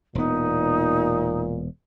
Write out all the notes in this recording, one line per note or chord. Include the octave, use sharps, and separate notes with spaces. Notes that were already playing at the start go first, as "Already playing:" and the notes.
E1 A#2 B3 D#4